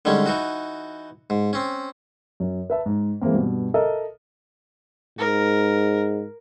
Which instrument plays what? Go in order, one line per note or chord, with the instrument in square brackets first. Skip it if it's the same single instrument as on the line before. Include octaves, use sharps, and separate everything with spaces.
[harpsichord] D3 D#3 G3 G#3 C#4
E3 D#4 F#4
G#2
C4 C#4
[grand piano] F#2
B4 E5 A5
G#2
E3 G#3 A#3 C4
G2 B2
A4 A#4 D#5 E5
[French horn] G#2 [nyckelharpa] A#4